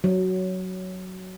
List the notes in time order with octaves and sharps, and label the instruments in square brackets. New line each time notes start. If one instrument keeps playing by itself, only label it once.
[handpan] F#3